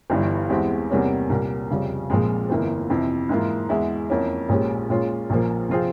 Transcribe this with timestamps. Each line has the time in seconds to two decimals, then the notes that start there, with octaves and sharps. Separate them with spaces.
0.10 G1 G2 E3 G3
0.50 E2 E3 G#3 C4 G4
0.90 E2 C3 G3 A#3 C#4
1.30 C2 A#2 G3 A#3
1.70 F1 F2 C#3 G3
2.10 A#1 A#2 F3 G#3 C4
2.50 G1 F2 E3 A#3
2.90 F2 C3 E3
3.29 G#2 E3 A#3 F4
3.69 E2 E3 G#3 E4
4.10 F2 E3 A#3 C#4
4.49 A#1 A#2 G#3 C#4 G4
4.90 A#2 G#3 C#4 F4
5.30 A#1 A#2 F3 A#3
5.69 C3 F3 C4 F4 G#4